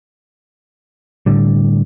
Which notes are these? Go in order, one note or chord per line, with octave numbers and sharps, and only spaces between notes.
A2 D3 G3